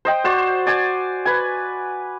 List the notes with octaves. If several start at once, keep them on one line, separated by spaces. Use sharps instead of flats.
C5 D#5 G5
F#4 C5 D5
D5 G#5
B4 G#5